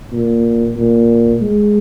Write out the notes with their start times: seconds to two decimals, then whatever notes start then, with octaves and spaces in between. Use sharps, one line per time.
0.12 A#2
0.77 A#2
1.41 G#3